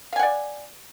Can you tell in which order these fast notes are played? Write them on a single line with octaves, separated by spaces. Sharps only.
F5 G#5 F#5 D5